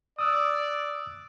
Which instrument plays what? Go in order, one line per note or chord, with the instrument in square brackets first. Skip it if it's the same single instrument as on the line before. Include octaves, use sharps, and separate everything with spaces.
[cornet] D5 [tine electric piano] D#6 E6 F#6